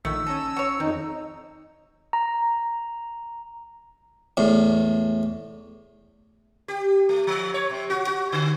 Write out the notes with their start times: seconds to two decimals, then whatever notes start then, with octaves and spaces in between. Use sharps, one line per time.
0.05 A#1 D#3 A3 E6 B6
0.27 C#4 A4 A#5 D#7
0.56 F#4 C#5
0.80 F2 D#3 C4 D#4
2.13 A#5
4.37 E2 A2
6.68 G4
7.09 A3
7.27 F3
7.54 C#5
7.70 C3
7.90 F#4
8.07 F#4
8.32 D3